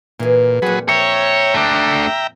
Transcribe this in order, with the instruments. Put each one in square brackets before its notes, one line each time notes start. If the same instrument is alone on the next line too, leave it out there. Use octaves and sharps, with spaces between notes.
[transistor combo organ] A#2 [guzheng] E3 G#4
[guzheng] F2 A#2 [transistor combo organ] F#3 G#4 B4
[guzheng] F3 [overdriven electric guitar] C#5 [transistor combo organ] E5 G5 A#5
[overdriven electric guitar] A3 D4